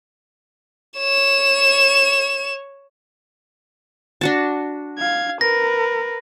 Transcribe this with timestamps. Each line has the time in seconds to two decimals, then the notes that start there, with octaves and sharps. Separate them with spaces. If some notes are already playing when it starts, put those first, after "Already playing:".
0.98 C#5 E7
4.21 D4 F#4 A5
4.99 F5 G#6
5.41 A#4 B4 A#6